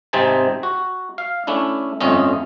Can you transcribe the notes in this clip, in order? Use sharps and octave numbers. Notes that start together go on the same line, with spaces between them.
G#1 C3 C4 D#4 G#5 A5
F#4
F5
A3 C#4 D4 E4
G1 F2 A3 C#4 D#5